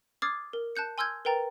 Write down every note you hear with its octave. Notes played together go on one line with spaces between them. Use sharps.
D6 D#6 F6 G#6 A6 C7
A#4
A5 F#6 G6 C#7
G#5 C6 E6 F6 G6 G#6
A#4 B4 G5 A#5 A6